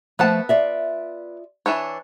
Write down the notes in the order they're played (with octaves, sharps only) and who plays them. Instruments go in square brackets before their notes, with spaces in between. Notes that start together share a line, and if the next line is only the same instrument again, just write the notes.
[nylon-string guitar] F3 A3 [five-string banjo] B3 F#5 A5
[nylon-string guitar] F4 D5 E5
[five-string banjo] E3 D4 C#5